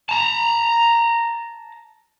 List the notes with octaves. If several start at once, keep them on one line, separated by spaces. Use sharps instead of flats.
A5 A#5